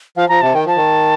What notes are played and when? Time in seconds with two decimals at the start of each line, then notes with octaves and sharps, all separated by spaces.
0.16 F3 F5
0.28 F3 A#5
0.41 C3 A5
0.54 D#3 G5
0.66 F3 A5
0.77 D#3